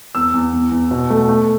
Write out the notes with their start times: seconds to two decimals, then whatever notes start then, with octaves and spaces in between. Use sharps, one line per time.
0.15 E2 E6
0.34 E2
0.53 E2
0.72 E2
0.91 B2
1.10 A3
1.29 A3